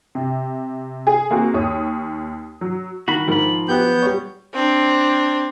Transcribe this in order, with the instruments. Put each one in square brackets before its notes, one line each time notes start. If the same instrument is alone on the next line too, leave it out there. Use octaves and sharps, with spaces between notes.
[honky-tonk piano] C3
G#4
A#3 C4 F#4 G#4
D#2 C#5 D#6
F#3
[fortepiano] D#3 [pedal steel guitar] F#4 B5
[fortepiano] G#2 D#3 A#4 [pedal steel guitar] F3 B5
[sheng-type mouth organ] B3 G6 [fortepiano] G4 F#6
[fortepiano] G3 C#5
[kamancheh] C4 D4